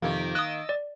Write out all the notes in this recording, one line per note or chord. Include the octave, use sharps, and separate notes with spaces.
F2 C3 D#3 A#3 G4
D#5 D#6 E6 F#6 A6
D5